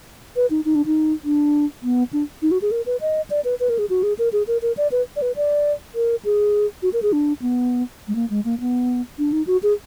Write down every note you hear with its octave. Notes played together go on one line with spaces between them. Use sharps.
B4
D#4
D#4
D4
D#4
D4
B3
D4
D#4
F#4
G#4
A#4
B4
D#5
D5
B4
B4
A#4
G#4
F#4
G#4
A#4
G#4
A#4
A#4
D5
B4
D5
B4
D5
A#4
G#4
F#4
A#4
G#4
D4
B3
G#3
A#3
G#3
A#3
B3
D4
D#4
F#4
G#4